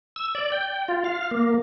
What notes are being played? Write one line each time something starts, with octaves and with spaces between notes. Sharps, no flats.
E6
D5
G5
F4
F5
A#3